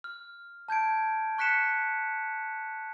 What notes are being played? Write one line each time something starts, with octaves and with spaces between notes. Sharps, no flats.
F6
A5 G6 G#6 D7
C#6 F#6 B6 C#7 E7